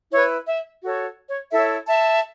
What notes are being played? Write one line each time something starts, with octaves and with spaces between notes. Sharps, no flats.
E4 B4 C#5
E5
F#4 A4 C#5
C#5
E4 A4 C#5 E5
E5 A5